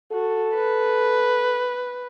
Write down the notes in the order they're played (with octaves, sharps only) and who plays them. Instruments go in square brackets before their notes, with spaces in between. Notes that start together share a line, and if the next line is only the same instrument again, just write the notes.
[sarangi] F#4 [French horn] A4
[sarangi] B4